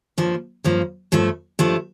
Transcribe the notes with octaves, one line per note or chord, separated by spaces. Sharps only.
G2 F3 A#3
G2 F3 A#3
G2 F3 A3
G2 F3 A3